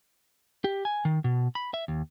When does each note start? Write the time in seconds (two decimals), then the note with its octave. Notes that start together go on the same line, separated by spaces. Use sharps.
0.64 G4
0.85 G#5
1.05 D#3
1.24 B2
1.55 B5
1.74 E5
1.88 D#2